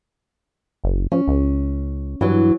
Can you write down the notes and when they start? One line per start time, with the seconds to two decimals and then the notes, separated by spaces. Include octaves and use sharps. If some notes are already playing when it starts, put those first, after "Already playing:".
0.84 F#1
1.12 F3 C#4
1.28 C#2
2.21 G2 E3 F#3